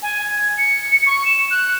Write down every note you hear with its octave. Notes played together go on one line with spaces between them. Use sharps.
G#5
G#6
C#7
C#6
E7
F#6